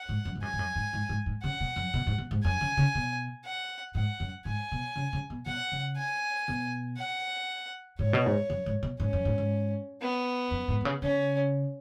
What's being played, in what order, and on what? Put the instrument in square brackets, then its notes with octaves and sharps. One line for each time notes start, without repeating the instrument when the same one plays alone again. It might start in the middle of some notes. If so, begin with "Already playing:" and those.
Already playing: [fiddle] F#5
[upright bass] G#2
F#2
G#2
[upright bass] F#2 [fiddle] G#5
[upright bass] G#2
F#2
G#2
G#2
G#2
G#2
[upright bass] C#3 [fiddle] F#5
[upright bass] B2
F#2
B2
G#2
B2
G#2
[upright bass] F#2 [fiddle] G#5
[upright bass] C#3
C#3
B2
[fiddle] F#5
[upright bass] G#2 [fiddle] F#5
[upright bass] F#2
[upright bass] G#2 [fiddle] G#5
[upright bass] B2
C#3
C#3
B2
[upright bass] B2 [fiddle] F#5
[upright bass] C#3
[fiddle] G#5
[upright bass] B2
[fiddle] F#5
[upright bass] G#2 [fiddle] C#5
[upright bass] B2
G#2
F#2
G#2
B2
[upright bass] G#2 [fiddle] C#4
[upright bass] F#2
G#2
G#2
[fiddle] B3
[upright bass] F#2
G#2
B2
C#3
[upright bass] C#3 [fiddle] C#4